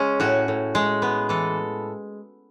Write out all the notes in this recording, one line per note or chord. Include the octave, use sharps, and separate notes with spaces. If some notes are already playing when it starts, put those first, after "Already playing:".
Already playing: G#3 C#4
A2 F#4
A2
G#3
B3
E3 A4